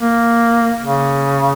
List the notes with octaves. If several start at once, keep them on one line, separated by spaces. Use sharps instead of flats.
A#3
C#3